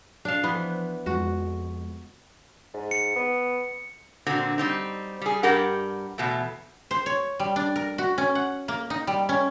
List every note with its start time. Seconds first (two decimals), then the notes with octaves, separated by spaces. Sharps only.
0.25 D4 F5
0.43 E3 F3 B3 C5
1.06 F2 G#3 F#4
2.74 G#2
2.91 C#7
3.15 B3
4.27 A#2 D3 C4 F#4
4.58 G3 C4 D#4
5.21 G3 G#4
5.43 G2 G4 A#4 F#5
6.18 E2 B2 A3
6.91 C5
7.06 C#5
7.40 G3
7.56 D4
7.76 A#4
7.98 F#4
8.18 C#4
8.35 F#5
8.68 A#3
8.90 D#4
9.07 G3
9.29 C#4